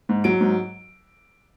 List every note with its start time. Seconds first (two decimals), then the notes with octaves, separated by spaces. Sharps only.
0.09 G#2
0.24 F#3 D7
0.41 G#2